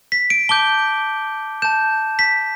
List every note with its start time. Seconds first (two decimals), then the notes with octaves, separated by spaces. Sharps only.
0.12 B6
0.30 D7
0.49 A5 D6 G6 G7
1.62 A5 G6 E7
2.19 B6